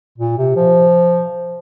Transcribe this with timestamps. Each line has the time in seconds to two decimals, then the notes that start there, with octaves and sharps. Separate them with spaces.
0.18 A#2
0.38 C3
0.56 F3